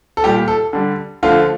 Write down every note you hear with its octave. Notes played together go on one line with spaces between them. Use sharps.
A4
A#2 G3 G4
A4
D3 G3
D3 F3 A3 F4